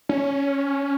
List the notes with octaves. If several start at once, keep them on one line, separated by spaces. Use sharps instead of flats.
C#4